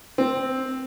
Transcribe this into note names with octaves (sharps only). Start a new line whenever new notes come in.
C4